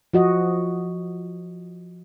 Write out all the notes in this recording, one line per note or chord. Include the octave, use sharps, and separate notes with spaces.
F3 F#4 D#5